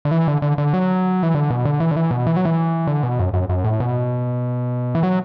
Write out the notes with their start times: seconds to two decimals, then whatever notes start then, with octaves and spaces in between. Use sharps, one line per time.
0.05 D3
0.11 E3
0.28 D3
0.42 D3
0.58 D3
0.73 F#3
1.23 E3
1.34 D3
1.50 B2
1.65 D3
1.80 E3
1.91 D3
1.96 E3
2.11 B2
2.27 E3
2.36 F#3
2.45 E3
2.87 D3
3.03 B2
3.19 F#2
3.33 F#2
3.49 F#2
3.64 A2
3.80 B2
4.95 E3
5.03 F#3